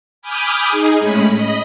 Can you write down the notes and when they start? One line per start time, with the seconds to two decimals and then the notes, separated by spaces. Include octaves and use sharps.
0.22 G#5 B5 D6 D#6 F6 G6
0.68 D#4 G#4
1.00 A2 G#3 C#4 B5
1.31 D#5 B5